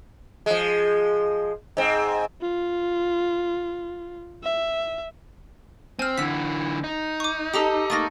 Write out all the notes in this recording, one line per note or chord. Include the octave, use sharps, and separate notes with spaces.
F3 G#3
G#2 C4
F4
E5
C4 G#5 F6
D3 E3 E6 B6
D#4
C#6 D6
G4 A4 D#5 A#5 D#6
A3 A#3 D#6 A6 A#6